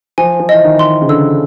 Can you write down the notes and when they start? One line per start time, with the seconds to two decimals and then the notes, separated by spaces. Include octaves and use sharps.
0.18 F3 G#5
0.40 F3
0.49 E3 D#5
0.64 D#3
0.79 C6
1.02 C#3
1.09 D3 E6